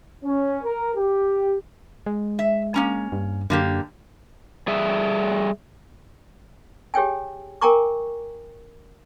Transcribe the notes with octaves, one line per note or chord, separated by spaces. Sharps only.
C#4
A#4
G4
G#3
E5
A#3 C#4 A#5
G2
F#2 D3 A#3 G4
G3 G#4 E5
G4 G#4 C#5 G5 G#5
A#4 G5 G#5 A#5 C#6 D6